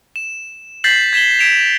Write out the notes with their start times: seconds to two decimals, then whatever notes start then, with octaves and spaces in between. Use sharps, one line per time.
0.16 E7
0.84 G6 A6 B6 C7 F#7
1.13 G#6 B6 E7 F#7 G7
1.39 G#6 B6 D7 E7 F7